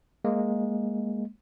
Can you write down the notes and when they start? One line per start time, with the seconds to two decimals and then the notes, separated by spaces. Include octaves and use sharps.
0.25 G#3 A#3